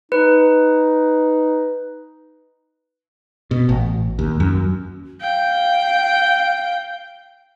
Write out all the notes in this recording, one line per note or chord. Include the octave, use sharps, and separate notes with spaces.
D#4 B4
B2
A1
D#2
F#2
F5 G5